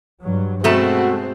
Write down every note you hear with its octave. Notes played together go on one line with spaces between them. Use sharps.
G2 F#3
B2 G#3 A3 C4 F#4 A5